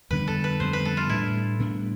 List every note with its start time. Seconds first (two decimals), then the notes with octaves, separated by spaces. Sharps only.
0.11 F2 D3 G3 B3 B4
0.28 A4
0.44 B4
0.60 F2 D3 G3 B3 C5
0.73 B4
0.85 A4
0.97 F4
1.09 A2 G3 B3 D4 E4
1.59 A2 G3 B3 D4